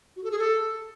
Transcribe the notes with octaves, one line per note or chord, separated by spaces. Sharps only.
F#4
A4
G#4
A4